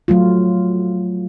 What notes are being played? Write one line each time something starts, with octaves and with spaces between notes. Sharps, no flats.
F#3 A3 F4